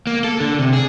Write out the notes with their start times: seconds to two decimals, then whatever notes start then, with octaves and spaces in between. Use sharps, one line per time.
0.07 A#3
0.24 A4
0.40 D3
0.59 C3
0.73 G#4